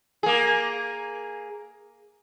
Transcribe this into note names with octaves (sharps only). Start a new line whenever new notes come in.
A#3 G#4